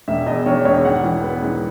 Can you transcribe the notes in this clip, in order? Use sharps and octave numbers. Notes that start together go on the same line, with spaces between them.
E1 E5
E2 D#5
D#3 C#5
E1 C#5
G#2 F#5
E3
B3
G#2